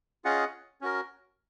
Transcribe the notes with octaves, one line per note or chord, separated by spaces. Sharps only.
C#4 F4 G#4 D#5 F#5
C#4 F#4 A#4